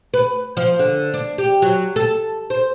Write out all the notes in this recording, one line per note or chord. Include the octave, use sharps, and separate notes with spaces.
B4
F3
D3
D4
G4
F#3
A4
C5